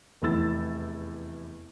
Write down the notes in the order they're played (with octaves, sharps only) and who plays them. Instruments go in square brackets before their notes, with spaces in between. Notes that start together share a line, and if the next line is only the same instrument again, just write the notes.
[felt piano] F1 E2 E4 E6 A6